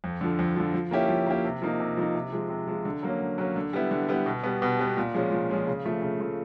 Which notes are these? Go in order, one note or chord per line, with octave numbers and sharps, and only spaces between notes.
F2
D3 F3
F2
D3 F3
F3
A#3 C#4 E4 G4
F3
A#3 C#4 E4 G4
C3
F3 A#3 D#4
C3
F3 A#3 D#4
C3
F3 G#3
C3
F3 G#3
D3
F#3 A#3 C#4
D3
F#3 A#3 C#4
D3
G3 B3 E4
D3
G3 B3 E4
B2
G3 B3
B2
G3 B3
A#2
F3 G#3 C#4
A#2
F3 G#3 C#4
C#3
F3 A3
C#3
F3 A3